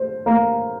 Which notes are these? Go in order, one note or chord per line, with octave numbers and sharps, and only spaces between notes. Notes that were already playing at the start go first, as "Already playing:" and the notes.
Already playing: C5
A#3